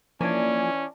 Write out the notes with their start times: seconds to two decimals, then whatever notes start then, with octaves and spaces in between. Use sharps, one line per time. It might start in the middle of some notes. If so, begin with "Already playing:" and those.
0.21 E3 F3 A#3 C#4 D4 G#5